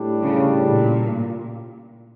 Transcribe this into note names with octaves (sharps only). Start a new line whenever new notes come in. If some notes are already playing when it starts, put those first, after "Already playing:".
Already playing: A2 G3 D4
C#3
A#2